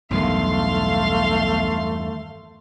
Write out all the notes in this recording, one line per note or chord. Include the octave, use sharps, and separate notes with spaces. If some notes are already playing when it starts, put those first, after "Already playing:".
B1 E2 G2 D#3 A3 F5 C6